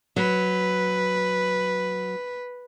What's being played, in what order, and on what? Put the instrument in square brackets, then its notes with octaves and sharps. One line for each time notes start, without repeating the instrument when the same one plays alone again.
[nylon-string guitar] F#3 [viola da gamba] B4